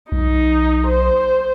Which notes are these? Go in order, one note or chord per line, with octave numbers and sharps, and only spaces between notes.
B1 D#4
C5